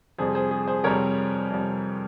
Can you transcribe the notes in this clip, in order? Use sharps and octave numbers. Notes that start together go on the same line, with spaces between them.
F2 C3 G3 G#4 C5
G#4 C5
G#4
G#4 C5
F2 C3 G3 A#4 C#5
F2 C3 G3